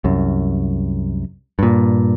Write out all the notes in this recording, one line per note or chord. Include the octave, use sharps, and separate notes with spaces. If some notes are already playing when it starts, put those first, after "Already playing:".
C2 F#2
G2 A#2